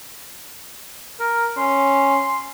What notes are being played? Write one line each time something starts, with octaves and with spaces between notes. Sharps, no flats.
A#4
C#4 C6